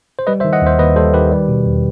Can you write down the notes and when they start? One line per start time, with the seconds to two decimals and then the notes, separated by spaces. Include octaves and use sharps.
0.19 C5
0.27 G3 B4 D#5
0.40 C5 E5
0.45 D#3
0.53 D#5 F#5
0.62 D#2 C5 E5
0.79 D#2 B4 D#5
0.96 G3 A4 C5
1.14 D#3 G4 B4
1.32 G3
1.48 B2
1.65 E2